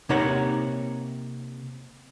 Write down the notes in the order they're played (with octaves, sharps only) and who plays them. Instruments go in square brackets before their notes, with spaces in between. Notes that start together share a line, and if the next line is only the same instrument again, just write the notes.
[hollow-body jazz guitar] C3 A#3 D#4 C#5 F#5 A#5